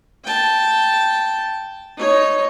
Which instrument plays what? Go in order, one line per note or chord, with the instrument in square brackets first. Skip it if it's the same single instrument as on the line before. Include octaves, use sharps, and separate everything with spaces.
[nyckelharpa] G5 A5
D#4 C#5